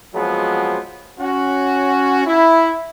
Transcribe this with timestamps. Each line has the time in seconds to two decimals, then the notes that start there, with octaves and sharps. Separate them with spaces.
0.14 F3 F#3 G#3 B3 C4
1.20 C#4 F#4
2.26 E4